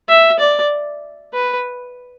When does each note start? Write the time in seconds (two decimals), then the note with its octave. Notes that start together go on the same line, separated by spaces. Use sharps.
0.09 E5
0.40 D5
1.34 B4